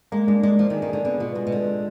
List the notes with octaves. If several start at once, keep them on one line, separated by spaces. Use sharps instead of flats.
G#3 A#3
G#3 D4
G#3 D4
F3 D4
D#3
G#4
D#3
D3 G#4
D3 B3
B2 F4
B2 G#3
B2
D3 G#3
G#3